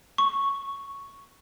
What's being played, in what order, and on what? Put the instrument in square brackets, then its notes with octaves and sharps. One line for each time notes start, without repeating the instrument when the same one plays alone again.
[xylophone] C#6